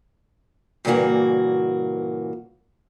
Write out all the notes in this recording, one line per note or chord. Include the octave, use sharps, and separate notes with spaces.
G2 A#2 C#3 E3 A#3 F#4